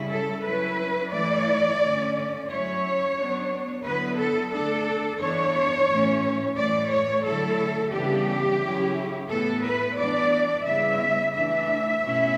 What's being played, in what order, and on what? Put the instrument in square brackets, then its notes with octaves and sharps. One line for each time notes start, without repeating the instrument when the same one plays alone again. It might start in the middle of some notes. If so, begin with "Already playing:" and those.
Already playing: [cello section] C#3 G3 C#4 E4
A4
F#3 C#4 E4 B4
E3 A3 E4 D5
D3 A3 C#4
F#3 C#4 E4 C#5
F#3 B3 D4
D3 F#3 B3 E4 B4
A4
D3 A3 D4 A4
E3 B3 D4 C#5
A2 E3 A3 C#4
A2 E3 A3 D5
C#5
D3 F#3 A3 E4 A4
C#3 E3 G3 B3 D4 G4
C#3 F#3 C#4 E4
A2 E3 B3 E4 A4
B4
E3 B3 D4 D5
C#3 G3 B3 E4 E5
E3 A3 D4 E5
B2 A3 C#4 E4